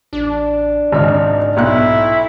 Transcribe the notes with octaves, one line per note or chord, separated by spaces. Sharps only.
A1 D4
G#1 C#2 G#2 D#5 F6
B1 B3 E4 F#6